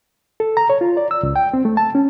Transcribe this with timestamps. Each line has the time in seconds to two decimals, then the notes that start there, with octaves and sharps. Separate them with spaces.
0.40 A4
0.57 A#5
0.70 C#5
0.81 F4
0.97 D5
1.11 E6
1.23 C#2
1.36 G5
1.54 C4
1.65 A3
1.77 A5
1.95 C#4